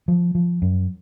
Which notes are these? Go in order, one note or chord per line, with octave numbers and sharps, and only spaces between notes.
F3
F3
F#2